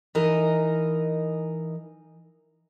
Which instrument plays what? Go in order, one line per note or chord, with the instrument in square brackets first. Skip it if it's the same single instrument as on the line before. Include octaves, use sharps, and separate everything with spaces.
[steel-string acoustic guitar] E3 D#4 A#4 D#5